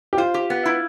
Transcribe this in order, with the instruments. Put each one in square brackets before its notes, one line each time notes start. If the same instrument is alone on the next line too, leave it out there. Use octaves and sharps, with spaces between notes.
[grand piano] G4
[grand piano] F4 [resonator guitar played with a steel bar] C5
[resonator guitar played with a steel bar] G4
B3
E4